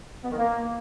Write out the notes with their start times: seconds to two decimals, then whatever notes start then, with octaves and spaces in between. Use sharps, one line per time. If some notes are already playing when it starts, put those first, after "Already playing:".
0.24 B3
0.31 D#3
0.38 A#3